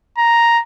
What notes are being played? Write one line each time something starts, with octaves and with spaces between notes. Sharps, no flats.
A#5